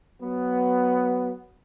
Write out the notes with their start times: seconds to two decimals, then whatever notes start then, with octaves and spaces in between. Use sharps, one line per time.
0.21 F#3 B3